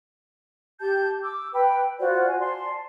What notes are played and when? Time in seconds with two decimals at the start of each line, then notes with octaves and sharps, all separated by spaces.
0.80 G4 A5 G6
1.23 D6 E6
1.53 B4 G5 B5
1.99 F4 F#4 C5 D5
2.27 G#5
2.39 D5 A5 C6